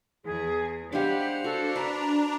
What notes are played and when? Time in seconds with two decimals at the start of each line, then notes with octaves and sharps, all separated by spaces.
0.25 E2 G#4
0.92 G3 G#3 D4 G4 C5 F5 F#5
1.44 D4 F#4 A4
1.76 B4 A#5